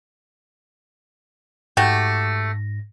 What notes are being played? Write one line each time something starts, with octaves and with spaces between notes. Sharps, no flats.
G#2 A3 F#4 G4 A#6